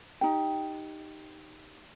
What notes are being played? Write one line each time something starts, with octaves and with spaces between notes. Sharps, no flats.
D#4 G4 G5